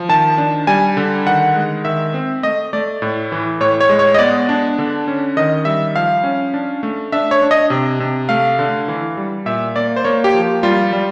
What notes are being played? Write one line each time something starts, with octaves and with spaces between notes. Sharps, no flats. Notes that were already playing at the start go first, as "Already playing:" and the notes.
Already playing: F3
D#3 A5
D4
G3 G#5
D3
D#3 F#5
G#3
D#3 E5
C4
A3 D#5
A3 D5
A2
E3
A2 C#5
C#5
G#3
C#5
D#5
B3 D5
D4
D3
C#4
D#3 D#5
G3 E5
F3 F5
C#4
D4
A3
D4 E5
C#5
D4
D#5
C3
C3
A3 F5
D3
E3
G3
A#2 E5
A#3 D5
C5
A#3 C#5
G4
F3
G3 F4
G3